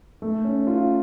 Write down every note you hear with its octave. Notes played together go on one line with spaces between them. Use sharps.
A3
C#4
F4